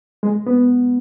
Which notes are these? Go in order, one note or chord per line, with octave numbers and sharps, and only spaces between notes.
G#3
B3